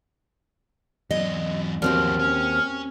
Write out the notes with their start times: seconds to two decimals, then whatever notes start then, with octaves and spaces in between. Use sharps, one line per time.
1.11 E2 F#3 D#5
1.82 D#2 F3 B3 C4 F#4 F6
2.19 C#4